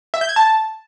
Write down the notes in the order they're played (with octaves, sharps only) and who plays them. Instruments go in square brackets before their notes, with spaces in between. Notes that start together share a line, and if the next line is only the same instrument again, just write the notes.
[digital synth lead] E5
G6
G#6
A5